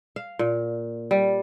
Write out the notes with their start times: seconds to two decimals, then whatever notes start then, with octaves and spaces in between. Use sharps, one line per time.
0.16 F5
0.39 A#2
1.11 G3